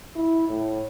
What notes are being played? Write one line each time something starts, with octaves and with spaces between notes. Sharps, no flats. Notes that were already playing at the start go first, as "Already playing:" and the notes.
E4
A2